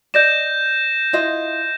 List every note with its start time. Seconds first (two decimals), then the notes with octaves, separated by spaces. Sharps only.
0.14 D5 D#5 G6 A#6 E7
1.13 E4 F4 D#5